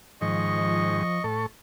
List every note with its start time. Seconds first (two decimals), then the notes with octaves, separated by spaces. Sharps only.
0.21 G#2 D#3 F3 D#5 C#6
1.24 A2 A4 C#6